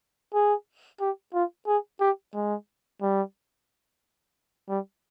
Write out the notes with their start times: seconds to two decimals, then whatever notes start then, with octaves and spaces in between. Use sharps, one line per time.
0.34 G#4
1.00 G4
1.33 F4
1.67 G#4
2.00 G4
2.34 G#3
3.02 G3
4.69 G3